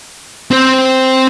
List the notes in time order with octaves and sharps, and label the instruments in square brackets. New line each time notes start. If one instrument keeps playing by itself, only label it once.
[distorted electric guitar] C4 C5